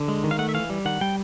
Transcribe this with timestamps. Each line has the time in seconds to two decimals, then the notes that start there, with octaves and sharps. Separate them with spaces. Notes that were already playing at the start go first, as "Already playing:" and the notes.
Already playing: D3
0.08 G#3
0.24 D#3
0.31 F5
0.39 A3 F#5
0.49 E5
0.54 E3 F5
0.70 G3
0.85 D#3 F#5
1.01 G3 G5